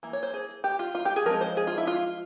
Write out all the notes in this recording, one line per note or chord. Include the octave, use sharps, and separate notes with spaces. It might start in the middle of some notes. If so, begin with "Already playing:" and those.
E3 A#3
C#5
C5
G#4
G4
F4
F4
G4
G#4
F3 G#3 C4 A#4
C5
G#4
F4
E4
F4